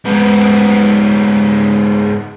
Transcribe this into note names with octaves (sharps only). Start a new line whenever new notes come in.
G#2 B3